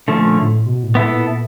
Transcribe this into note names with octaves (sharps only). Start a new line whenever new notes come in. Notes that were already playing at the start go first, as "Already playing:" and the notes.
A#2 D3 F3 A3 C#4
A2
B2
A2
A#2 B3 E4 A4
A#2